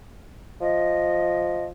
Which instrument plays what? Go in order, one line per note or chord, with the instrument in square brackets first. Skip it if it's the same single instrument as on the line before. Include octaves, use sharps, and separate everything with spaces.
[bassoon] F3 [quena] D#5